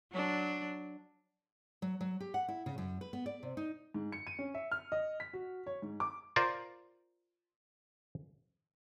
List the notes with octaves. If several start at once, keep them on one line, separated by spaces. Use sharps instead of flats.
F#3 D4
F#3
F#3
G4
F#5
E4
C#3
F#2
B4
B3
D5
C3
D#4
G#2
C#7
D#7
C#4
E5
F6
D#5
B6
F#4
C#5
G#2
D6
F4 A#4 C5 D5